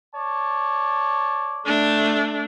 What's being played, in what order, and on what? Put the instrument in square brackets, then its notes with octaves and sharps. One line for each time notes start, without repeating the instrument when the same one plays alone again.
[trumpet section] C#5 D5 A5
[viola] A3 D4